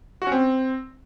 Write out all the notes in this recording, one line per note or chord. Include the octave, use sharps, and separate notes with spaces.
F#4
C#4
C4